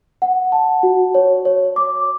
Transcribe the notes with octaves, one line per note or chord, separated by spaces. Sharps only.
F#5
A5
F#4
C#5
C#5
D6